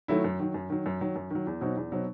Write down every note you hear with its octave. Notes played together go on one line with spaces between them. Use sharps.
D#3 F#3 A3 E4
F#2
D#3 F#3
F#2
D#3 F#3
F#2
D#3 F#3
F#2
D#3 F#3
E2
B2 F#3 C4 D#4
E2
B2 F#3 C4 D#4